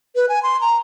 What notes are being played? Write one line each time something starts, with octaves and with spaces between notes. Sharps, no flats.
B4
G#5
C6
A#5